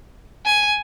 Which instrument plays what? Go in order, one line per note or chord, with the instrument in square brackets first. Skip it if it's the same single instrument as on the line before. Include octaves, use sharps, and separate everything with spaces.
[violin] G#5